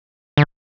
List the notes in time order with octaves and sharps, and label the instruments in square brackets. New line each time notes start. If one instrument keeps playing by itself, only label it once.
[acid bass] D3